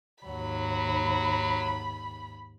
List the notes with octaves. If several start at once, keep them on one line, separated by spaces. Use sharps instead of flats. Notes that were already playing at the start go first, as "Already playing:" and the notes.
D#2 G#2 F#3 B5